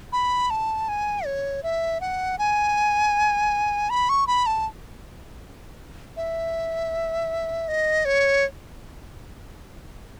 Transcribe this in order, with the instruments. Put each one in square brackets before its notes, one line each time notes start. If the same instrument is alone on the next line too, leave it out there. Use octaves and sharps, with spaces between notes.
[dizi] B5
A5
G#5
C#5
E5
F#5
G#5
B5
C#6
B5
A5
E5
D#5
C#5